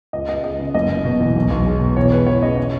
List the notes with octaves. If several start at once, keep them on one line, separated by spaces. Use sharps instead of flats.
C#2 D#5
C#2 D#5
G#3 D#5
C#3
F#1 D#5
F#1
B2
E2
B1
B1
G#3
B2
E2 C#5
G#3 B4
E3 C#5
C#3 D#5
C#5